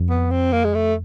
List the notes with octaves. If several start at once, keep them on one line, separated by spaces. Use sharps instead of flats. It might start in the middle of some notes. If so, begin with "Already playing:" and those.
Already playing: F2
B3
C4
A#3
G#3
A3